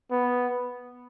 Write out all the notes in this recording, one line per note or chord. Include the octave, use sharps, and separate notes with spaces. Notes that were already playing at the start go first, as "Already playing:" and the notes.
B3